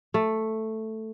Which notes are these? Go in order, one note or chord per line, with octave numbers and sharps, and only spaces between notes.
A3